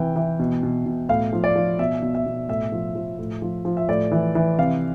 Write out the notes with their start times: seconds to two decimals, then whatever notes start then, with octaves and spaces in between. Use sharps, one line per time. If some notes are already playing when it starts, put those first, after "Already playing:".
Already playing: C3 E3 G5
0.16 E3
0.39 B2
0.63 B2
0.86 B2
1.09 A2 F5
1.33 F3
1.44 D5
1.56 F3
1.79 B2 E5
2.02 B2
2.15 E5
2.26 B2
2.49 A2 E5
2.72 F3
2.95 F3
3.19 A2
3.42 F3
3.65 F3
3.77 E5
3.89 A2 D5
4.12 E3
4.35 E3
4.58 C3 F5